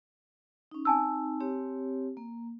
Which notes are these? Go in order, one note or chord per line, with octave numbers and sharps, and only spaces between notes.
C#4 D#4
C4 D#4 G#5 A5 E6
C4 G4 C#5
A#3